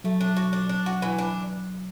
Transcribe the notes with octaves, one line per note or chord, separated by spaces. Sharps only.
F#3 A3
D4
F#4
D4
D4
F#4
E3
D4